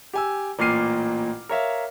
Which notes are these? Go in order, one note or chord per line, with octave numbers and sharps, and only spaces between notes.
G4 G#5 E6
A1 A#2 D6 F6 C7 D#7
A#4 C#5 E5 F5